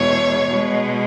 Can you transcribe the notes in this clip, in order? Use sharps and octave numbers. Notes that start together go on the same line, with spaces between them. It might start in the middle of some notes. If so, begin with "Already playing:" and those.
Already playing: E2 B2 G#3 C#5
B2 G#3